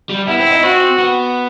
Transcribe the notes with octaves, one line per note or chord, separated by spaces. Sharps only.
G3
B3 E4
C4
D#4
C4 F#4
B3